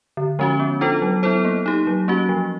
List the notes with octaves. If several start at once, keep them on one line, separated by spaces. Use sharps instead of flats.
D3
F3 G#3 C#4 F#4
B3
D4 F4 A4 C5
F#3
B3 E4 A4 C5
A#3
D#4 G4
F#3
A#3 C#4 F#4
F3